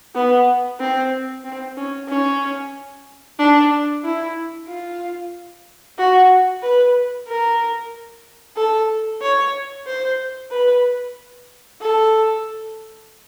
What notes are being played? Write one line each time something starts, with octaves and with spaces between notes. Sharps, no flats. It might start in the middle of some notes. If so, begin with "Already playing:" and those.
B3
C4
C4
C#4
C#4
D4
E4
F4
F#4
B4
A#4
A4
C#5
C5
B4
A4